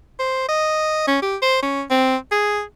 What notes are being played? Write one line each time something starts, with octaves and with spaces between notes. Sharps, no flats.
C5
D#5
C#4
G4
C5
C#4
C4
G#4